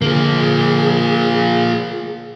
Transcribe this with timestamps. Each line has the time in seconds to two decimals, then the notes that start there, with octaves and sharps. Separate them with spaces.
0.02 D3 F3 A#3 G#4